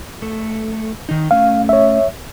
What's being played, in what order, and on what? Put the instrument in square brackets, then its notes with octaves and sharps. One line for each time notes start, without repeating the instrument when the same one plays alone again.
[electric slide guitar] A3 A4
D#3 D#4
[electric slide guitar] A3 C#4 [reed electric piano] F5
[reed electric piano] C#5 E5